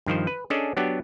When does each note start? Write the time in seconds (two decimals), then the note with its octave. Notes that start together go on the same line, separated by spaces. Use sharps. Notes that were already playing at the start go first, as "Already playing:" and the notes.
0.06 G2 D#3 F3 C5
0.27 B4
0.50 C#4 D4 G#4 A4 D5 D#5
0.77 F#3 B3 D4 G4